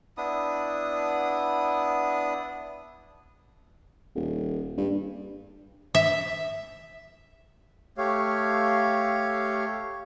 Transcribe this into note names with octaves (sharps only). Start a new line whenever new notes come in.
B3 D4 E4 D#6
D#1
G2
E5
A3 G4 C#5 F5